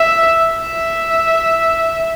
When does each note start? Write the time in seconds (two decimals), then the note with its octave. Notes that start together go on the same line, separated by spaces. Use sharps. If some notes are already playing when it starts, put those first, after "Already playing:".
Already playing: E5
0.58 E5